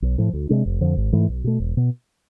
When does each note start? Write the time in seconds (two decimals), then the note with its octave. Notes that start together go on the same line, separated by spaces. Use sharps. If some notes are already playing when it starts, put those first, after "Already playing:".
0.02 B1
0.18 A2 F3
0.33 D2
0.49 C3 G#3 D4
0.66 F1
0.81 F2 D3 F3
0.97 G#1
1.13 G#2 E3 A3
1.29 B1
1.44 B2 A3
1.60 E1
1.77 B2